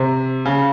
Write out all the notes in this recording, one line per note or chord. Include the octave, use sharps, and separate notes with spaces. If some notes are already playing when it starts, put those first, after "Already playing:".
Already playing: C3
C#3